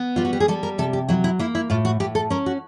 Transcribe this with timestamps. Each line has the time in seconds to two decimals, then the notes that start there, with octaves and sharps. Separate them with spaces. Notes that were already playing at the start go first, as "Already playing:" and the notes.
Already playing: B3
0.16 G3 F4
0.25 F#4
0.33 G4
0.40 G#4
0.48 G3 A4
0.63 A#4
0.78 C3 A4
0.93 G4
1.09 F#3 E4
1.24 E4
1.39 A#3 E4
1.55 E4
1.70 A2 F4
1.85 F#4
2.00 A2 G4
2.15 A4
2.30 C#4 A#4
2.46 F#4